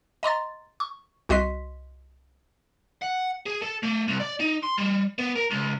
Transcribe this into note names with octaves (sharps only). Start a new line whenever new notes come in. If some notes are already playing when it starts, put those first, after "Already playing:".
D#5 A#5 C6 A6
C#6
C2 F#4 D#5 C6 B6
F#5
G#4
A4
A3
C2
D5
D#4
C6
G3
B3
A#4
C#2